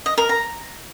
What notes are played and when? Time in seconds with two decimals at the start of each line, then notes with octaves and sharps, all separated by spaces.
0.06 D#5
0.18 A#4
0.29 A#5